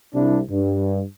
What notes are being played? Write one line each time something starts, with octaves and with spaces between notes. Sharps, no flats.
C2 D4 E4
G2